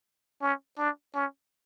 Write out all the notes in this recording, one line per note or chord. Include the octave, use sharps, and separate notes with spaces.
C#4
D4
C#4